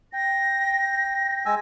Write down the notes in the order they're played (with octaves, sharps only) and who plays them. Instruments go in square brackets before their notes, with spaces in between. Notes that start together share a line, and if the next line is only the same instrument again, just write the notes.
[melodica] G5 [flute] A#6
[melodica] G#3 G#5 E6